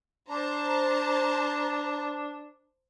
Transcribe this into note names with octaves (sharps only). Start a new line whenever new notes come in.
D4 C5 A5 A#5